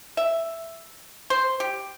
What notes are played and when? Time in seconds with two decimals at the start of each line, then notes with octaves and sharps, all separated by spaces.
0.17 E5
1.30 C5
1.60 G4